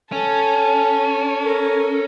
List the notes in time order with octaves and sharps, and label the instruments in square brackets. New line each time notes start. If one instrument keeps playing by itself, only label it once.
[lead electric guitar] C#4 [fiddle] A4 [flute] G#5
[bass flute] A4 [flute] A#4